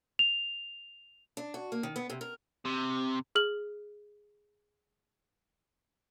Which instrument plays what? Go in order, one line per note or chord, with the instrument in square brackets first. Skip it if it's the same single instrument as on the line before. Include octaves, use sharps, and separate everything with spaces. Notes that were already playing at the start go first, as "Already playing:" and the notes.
[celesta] F7
[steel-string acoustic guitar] D4
F#4
A#3
D#3
B3
C3
A#4
[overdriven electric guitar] C3
[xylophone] G#4 F6 F#7